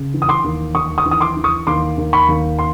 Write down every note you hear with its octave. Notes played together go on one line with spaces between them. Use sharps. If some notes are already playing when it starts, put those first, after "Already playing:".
Already playing: C#3
E3
D#6
C6 D6
D#2
D#2 C#6 D#6
C#6 D#6
E3
D#6
C6 D6
E3
C#6 D#6
D#2 C6 D6
D#2
B5 C#6
D#2
C6